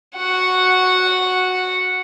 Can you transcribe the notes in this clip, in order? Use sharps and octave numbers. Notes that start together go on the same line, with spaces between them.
F#4 F#5